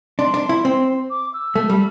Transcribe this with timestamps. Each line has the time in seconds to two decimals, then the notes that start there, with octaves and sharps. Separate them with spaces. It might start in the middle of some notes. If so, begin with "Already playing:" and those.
0.19 D4 C6
0.34 D4
0.49 E4
0.65 C4
1.10 D6
1.34 E6
1.56 A3
1.70 G3